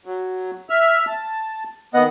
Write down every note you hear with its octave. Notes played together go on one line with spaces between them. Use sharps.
F#3
E5 F6
A5
D#3 B3 D#5 F#5